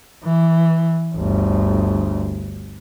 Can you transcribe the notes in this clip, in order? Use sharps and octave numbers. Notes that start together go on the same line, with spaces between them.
E3
G1 D2